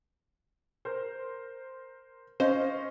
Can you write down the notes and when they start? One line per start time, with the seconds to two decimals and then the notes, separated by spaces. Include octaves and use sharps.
0.85 A#4 C5
2.40 C#4 C5 D#5 F5